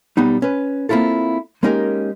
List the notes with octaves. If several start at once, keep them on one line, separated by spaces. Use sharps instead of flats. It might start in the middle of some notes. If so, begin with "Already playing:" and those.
B1 G3 B3 D#4
C#4 B4
A#3 C4 E4 F4 A4
G#3 A#3 C#4 D#4 G4 A#4